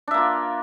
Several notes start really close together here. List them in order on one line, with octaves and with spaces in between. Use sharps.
D4 E5 A#3 F4